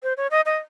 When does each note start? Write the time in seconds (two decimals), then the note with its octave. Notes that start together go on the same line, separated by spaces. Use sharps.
0.03 C5
0.17 C#5
0.31 D#5
0.46 D#5